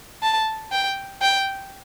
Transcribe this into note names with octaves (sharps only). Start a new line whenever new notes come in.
A5
G5
G5